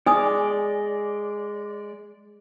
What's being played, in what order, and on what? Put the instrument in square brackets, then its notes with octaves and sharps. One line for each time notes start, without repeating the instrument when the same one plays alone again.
[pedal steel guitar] G#3 D5 [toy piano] D#4 G#5 D#6